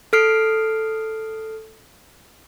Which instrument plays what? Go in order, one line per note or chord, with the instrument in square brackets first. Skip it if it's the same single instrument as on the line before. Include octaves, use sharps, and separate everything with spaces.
[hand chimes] A4 F6 C7 D7